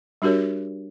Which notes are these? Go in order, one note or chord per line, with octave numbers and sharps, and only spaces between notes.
G3 D4 F#4 G4 A#4 C#5